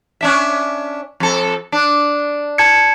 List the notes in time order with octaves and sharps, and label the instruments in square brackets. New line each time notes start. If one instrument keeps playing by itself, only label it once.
[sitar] C#4 D4 E5
F2 A4
D4
[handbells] A5 G#6 C#7